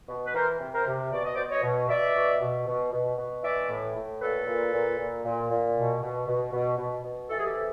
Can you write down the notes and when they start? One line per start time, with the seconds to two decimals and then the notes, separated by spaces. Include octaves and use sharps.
0.09 B2
0.25 B4
0.34 E3 A#4 C5
0.61 C3
0.73 A#4 C5
0.86 C3
1.12 B2 D5
1.24 D#5
1.35 B2 C5 D5
1.50 C#5 D#5
1.63 B2
1.89 B2 D5 E5
2.16 B2
2.41 B2
2.67 B2
2.93 B2
3.19 B2
3.43 E3 D5 E5
3.69 A2
3.96 A2
4.20 A#2 A4 B4
4.47 A#2
4.73 A#2
4.99 A#2
5.24 A#2
5.50 A#2
5.76 B2
6.02 B2
6.28 B2
6.53 B2
6.78 B2
7.04 B2
7.30 E3 A4
7.38 G#4
7.45 G4 A4
7.55 C3